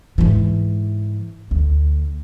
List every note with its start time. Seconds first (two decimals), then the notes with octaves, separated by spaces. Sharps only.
0.18 G#2 E3
1.51 D2